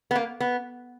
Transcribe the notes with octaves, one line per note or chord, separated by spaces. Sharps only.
B3
A#3
B3